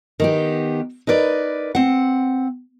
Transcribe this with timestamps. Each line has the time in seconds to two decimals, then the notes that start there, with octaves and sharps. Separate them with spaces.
0.20 D#3 B3 G4
1.07 D#4 A#4 B4 D5
1.75 C4 F#5